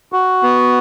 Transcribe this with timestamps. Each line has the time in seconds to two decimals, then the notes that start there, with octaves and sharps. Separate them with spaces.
0.12 F#4
0.43 B3